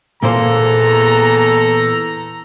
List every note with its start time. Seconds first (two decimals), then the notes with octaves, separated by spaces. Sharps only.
0.23 E2 A#2 A#3 A4 C5 A#5